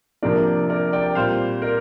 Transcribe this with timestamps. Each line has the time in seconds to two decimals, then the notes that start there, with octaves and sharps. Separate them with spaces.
0.23 C3 F3 A#3 D4 A#4 D5
0.70 A#4 D5
0.93 D5 G5
1.15 A#2 G3 C4 C5 F5
1.62 A#4 D5